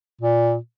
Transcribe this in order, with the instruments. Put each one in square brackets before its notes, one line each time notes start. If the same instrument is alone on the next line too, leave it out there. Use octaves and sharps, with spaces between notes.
[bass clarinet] A#2